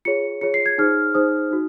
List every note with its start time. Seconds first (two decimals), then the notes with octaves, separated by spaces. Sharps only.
0.05 F4 G#4 C#5 C#7
0.41 F4 G#4 C#5 C#7
0.54 C7
0.66 G#6
0.78 D#4 G#4 C5 F6
1.14 D#4 G#4 C5 D#6
1.51 D#4 F#4